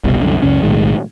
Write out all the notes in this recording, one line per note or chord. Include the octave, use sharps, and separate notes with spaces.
F#1 C2 B2 G3
C2 F#2 D3
C#2 F#2 C#3 C#4
B1 A2 D#3 G#3